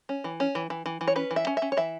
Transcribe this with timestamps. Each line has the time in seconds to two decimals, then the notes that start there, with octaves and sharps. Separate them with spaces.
0.09 C#4
0.24 E3
0.40 C#4
0.55 E3
0.70 E3
0.86 E3
1.01 E3
1.08 C#5
1.16 C#4 B4
1.31 E3
1.36 E5
1.47 C#4
1.57 E5
1.62 C#4
1.72 C#5
1.77 E3 E5